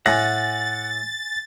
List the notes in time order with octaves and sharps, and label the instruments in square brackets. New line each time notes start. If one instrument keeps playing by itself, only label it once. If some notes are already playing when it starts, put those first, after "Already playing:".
[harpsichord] A2 [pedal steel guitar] F#5 [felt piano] G#5 A#6 [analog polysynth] A6